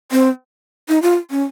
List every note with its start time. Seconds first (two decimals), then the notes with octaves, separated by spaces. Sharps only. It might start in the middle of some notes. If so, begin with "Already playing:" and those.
0.11 C4
0.89 D#4
1.02 F4
1.31 C#4